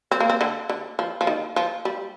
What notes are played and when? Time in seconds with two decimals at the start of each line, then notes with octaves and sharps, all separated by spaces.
0.11 C4
0.20 A#3
0.30 C4
0.41 D3
0.69 D3
0.99 F3
1.21 F3
1.27 D#3
1.56 F3
1.85 G3